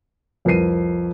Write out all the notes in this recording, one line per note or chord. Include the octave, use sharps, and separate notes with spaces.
C2 F2 A#4 B4 C7 D#7